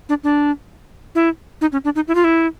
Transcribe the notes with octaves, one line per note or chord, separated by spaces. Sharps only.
D4
D4
E4
D#4
C#4
D4
D#4
E4
F4
E4